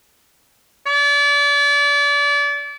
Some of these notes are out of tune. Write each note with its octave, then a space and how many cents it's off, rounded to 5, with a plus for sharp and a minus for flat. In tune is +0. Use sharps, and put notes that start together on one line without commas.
D5 -35